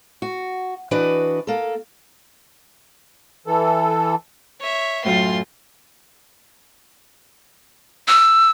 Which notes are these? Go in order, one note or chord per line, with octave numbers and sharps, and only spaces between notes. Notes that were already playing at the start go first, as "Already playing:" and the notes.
F#4
E3 D4 F#4 B4 D#5
A#3 A4
E3 A4
C#5 E5
F#2 A2 F4 C6
E6